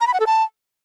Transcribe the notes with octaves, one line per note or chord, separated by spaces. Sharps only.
A#5
B5
F#5
A4
A5